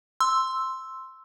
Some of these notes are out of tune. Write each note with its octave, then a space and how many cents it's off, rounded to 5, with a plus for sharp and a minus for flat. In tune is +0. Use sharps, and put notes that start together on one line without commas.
C6 +0 E6 +0